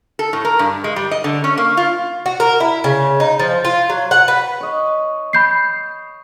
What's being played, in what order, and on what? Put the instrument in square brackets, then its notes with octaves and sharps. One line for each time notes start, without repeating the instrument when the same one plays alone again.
[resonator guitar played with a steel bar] A4
A2
A#4
G2
G#3
G3
D#5
D3
C#4
A#3
F4
[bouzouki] F#4
A#4
E4
C#3
D#4
F3
F4
F#3
F#5
B4
[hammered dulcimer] C#5 D#5
[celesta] B5 G6 C7